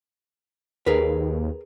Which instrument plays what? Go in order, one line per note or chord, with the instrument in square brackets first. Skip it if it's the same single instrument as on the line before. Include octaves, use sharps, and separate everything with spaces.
[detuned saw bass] D#2 [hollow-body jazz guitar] G#4 A#4 B4